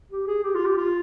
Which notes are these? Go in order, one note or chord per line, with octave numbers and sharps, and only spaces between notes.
G4
G#4
G4
F4
G4
F4